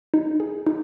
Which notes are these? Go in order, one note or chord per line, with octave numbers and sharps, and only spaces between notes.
D#4
G#4
D#4